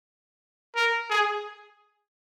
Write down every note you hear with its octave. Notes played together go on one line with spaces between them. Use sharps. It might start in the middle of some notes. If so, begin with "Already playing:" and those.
A#4
G#4